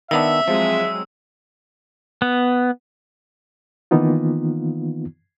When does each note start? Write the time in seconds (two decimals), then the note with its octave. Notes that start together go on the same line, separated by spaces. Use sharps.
0.11 D#3 B3 D4 E5 E6
0.48 F3 F#3 G#3 C4
2.22 B3
3.91 D#3 E3 A#3 B3 D#4 F4